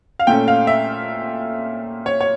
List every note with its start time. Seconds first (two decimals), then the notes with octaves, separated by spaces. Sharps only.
0.19 F5
0.27 A#2 A3 C#4 G5
0.48 F5
0.67 E5
2.06 C#5
2.21 C#5